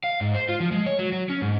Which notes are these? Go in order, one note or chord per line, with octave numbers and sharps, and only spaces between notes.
F5
G#2
C5
F4
F3
G#3
C#5
F#3
F#3
C#4
G#2